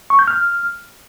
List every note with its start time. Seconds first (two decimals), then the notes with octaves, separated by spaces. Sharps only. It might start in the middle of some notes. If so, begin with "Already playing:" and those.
0.10 C#6
0.19 G6
0.28 F6